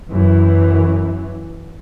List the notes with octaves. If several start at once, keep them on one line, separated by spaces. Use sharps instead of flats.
F#2 E3